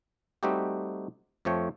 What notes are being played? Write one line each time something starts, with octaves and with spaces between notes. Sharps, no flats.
G3 A3 C4 D#4 F#4 G4
F2 F3 A3 C#5 G5